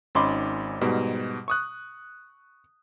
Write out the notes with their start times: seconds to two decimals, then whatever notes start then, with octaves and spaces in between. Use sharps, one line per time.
0.15 G#1 C#4 D#4 B5 C6 D6
0.81 G#2 B2 G3
1.48 C#6 D#6 F#6